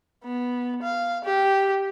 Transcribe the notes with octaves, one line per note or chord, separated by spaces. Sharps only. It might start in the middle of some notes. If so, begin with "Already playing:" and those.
B3
F5
G4